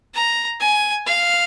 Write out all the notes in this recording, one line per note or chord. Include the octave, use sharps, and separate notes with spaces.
A#5
G#5
F5